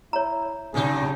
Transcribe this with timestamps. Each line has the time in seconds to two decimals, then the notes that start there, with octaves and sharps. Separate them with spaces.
0.13 E4 C#5 A#5
0.74 G2 C#3 F#3 D#4 G#4